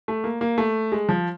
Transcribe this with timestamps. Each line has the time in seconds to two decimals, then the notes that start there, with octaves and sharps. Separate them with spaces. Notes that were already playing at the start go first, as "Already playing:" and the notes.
0.08 A3
0.24 A#3
0.41 A#3
0.58 A3
0.92 G#3
1.09 F3